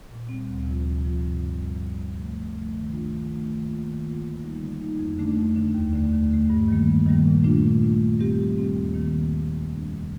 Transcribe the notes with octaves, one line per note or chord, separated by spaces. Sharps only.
A#2
G3 C4
D2
C3 F3 C4 F4
D2
C3 F3 C4 F4
G2
D3 G3
G2
D3 G3
C3
F3 A3
C3
F3 A3
D#3
A3 D4 F4
D#3
A3 D4 F4
D#3
A#3 F4
D#3
A#3 F4
D3
G3 A#3 D#4
D3
G3 A#3 D#4
F2
D3 A3 D4
F2
D3 A3 D4
D#2
D3 A3
D#2
D3 A3
G2
D#3 G3 A#3
G2
D#3 G3 A#3
A#2
A3 D4 F4
A#2
A3 D4 F4
A#2
G3 C4 G4
A#2
G3 C4 G4
D#2
D#3 A#3
D#2
D#3 A#3
F2
C3 G3 D4
F2